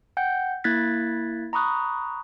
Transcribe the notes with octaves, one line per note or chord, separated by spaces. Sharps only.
F#5 G5 G6
A#3 E4 F#6 G#6 A6 B6
A#5 B5 C#6 D#6 F#6